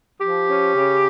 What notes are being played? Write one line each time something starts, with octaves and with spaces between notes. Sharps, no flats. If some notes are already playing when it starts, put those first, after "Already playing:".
F3 G4
C#4
C#3